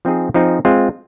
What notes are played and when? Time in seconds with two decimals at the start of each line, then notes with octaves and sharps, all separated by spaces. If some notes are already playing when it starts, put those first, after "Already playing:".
0.05 F3 C4 D#4 G#4
0.34 F3 C4 D#4 G#4
0.65 G#3 C4 F4